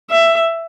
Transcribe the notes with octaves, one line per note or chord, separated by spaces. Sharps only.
E5